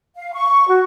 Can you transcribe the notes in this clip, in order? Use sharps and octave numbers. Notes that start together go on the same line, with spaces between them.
F5
C#6
F#4